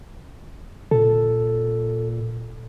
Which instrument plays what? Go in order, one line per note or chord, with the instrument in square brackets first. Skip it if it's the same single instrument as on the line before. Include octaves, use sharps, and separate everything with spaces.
[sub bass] A#2 [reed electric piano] A4